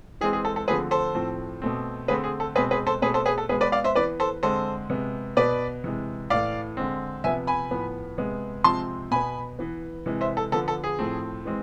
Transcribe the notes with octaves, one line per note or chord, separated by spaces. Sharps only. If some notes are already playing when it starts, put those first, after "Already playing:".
E3 G#3 C4 G#4
G#4
A4
A4
D3 F3 A3 C4 G#4 B4
A4 C5
A2 F3 A3 C4
B2 A3 C4
D3 A3 C4 G#4 B4
G#4
A4
B2 G#3 C4 G#4 B4
G#4 B4
A4 C5
B2 A3 C4 G#4 B4
A4 C5
G#4 B4
A4
B2 G#3 B3 G#4 B4
B4 D5
D5 F5
C5 E5
E3 B3 B4 D5
A4 C5
D3 G#3 C4 A4 C5
C3 G#3 B3
B2 B3 B4 D5
C3 E3 G#3
A2 E3 A3 D5 F5
D3 G#3 C4
C3 F3 B3 E5 G#5
G#5 B5
A2 F3 B3
C3 G#3 B3
C3 F3 G#3 C4 A5 C6
B2 B3 G#5 B5
E3 B3
C3 E3 G#3
C5 E5
A4
D3 F3 B3 A4
A4
G#4
A2 F3 A3 C4
E3 G#3 C4